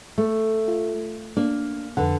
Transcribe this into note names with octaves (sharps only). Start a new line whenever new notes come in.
A3
F4
A#3 D4
F2 D3 B4 F#5